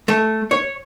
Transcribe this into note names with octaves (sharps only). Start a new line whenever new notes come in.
A3
C#5